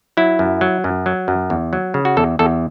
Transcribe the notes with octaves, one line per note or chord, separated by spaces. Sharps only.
F#3 E4
F#2
F#3
F#2
F#3
F#2
E2
F#3
C#3
F#4
E2 A4
E2 A4